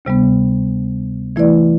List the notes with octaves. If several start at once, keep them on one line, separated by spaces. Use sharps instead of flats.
D2 C3 G3 B3
E3 A3 E4 B4 D5